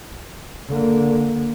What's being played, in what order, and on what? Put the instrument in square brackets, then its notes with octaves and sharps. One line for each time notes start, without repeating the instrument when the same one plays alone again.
[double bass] D3 A#3